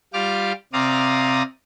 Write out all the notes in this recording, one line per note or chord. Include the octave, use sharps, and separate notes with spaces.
G3 F4 G4 D6 F6
C3 C4 D5 F5 A#5 D#6